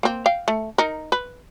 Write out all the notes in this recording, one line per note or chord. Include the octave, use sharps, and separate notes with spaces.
A#3 C4
F5 G5
A3
D#4 A#4
B4